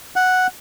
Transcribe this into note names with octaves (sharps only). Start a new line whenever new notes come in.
F#5